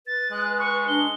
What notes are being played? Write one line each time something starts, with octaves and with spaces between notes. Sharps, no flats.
B4 A6
G#3 F#6
C#6
D4 G7